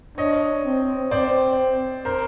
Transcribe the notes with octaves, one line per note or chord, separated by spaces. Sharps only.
D4 C#5 D#5
C4
C4 C5 D5
A#4 C5